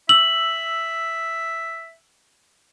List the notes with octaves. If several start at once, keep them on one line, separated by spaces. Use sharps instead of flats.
E5 E6 F#7